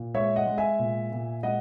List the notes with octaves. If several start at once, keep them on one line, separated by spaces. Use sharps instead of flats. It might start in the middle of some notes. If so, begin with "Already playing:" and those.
Already playing: A#2
G#3 C#5 E5
D#5 F#5
G#3
E5 G#5
A#2
A#2
G#3 D#5 F#5